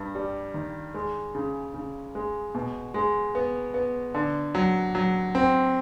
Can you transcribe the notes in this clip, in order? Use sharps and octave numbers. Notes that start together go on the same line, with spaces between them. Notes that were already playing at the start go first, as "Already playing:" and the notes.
Already playing: G2
G3
D#3
G#3
C#3
C#3
G#3
B2
G#3
B3
B3
D3
F#3
F#3
C4